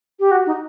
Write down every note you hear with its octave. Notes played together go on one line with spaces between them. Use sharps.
G4
F#4
D#4